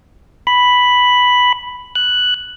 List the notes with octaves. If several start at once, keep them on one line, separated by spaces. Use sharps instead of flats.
B5
F#6